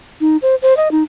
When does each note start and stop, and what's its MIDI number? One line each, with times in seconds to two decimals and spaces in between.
0.21 0.37 63
0.42 0.55 72
0.62 0.76 72
0.77 0.91 75
0.91 1.03 63